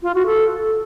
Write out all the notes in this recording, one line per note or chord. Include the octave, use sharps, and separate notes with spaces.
F4
F#4
A4